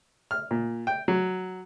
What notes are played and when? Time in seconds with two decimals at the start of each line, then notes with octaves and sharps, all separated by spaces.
0.31 F6
0.51 A#2
0.87 G5
1.08 F#3